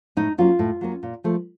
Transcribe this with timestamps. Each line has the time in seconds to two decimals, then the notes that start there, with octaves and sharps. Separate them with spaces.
0.17 A2 D#4
0.38 F#3 A#3 C#4 F4
0.59 A2
0.81 F#3 A#3 C#4
1.03 A#2
1.24 F3 A3